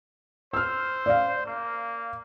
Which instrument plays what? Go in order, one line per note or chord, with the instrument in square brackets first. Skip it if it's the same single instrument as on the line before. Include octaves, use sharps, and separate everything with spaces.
[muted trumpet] C5 [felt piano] E6 F6
[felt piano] D5 F5
[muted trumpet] A#3